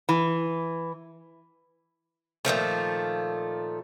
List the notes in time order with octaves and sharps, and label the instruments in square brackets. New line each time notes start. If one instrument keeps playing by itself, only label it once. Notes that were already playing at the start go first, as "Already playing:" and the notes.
[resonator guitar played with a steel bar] E3
[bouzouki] A#2 D#3 F3 A3